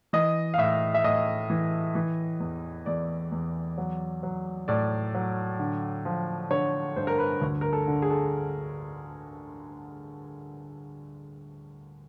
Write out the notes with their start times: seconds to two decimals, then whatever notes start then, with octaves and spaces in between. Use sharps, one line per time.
0.13 E3 D#5
0.54 F5
0.58 A2 E5
0.94 E5
1.04 A2 D#5
1.50 E3
1.95 E3
2.40 E2
2.86 E2 D5
3.32 E2
3.78 F#3
4.23 F#3
4.68 A2 D5
5.14 F#3
5.59 D3
6.05 F3
6.50 D3 C#5
6.96 G2 C5
7.07 A#4
7.18 B4
7.42 D2
7.61 A#4
7.73 A4
7.87 D3
8.02 G#4
8.10 A4